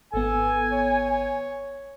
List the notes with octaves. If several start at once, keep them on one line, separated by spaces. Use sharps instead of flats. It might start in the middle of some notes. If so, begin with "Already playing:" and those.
G#1 B3 A4 G#5
C#5